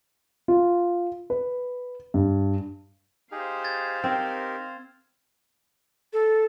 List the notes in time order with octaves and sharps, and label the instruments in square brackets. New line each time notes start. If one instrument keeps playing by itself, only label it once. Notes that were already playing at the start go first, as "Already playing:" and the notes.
[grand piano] F4
B4
G2
[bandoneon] D#4 G4 G#4 [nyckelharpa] C5 F5
[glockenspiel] G#6 A6
[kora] C4 [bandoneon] D#4 G4 A#4
[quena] A4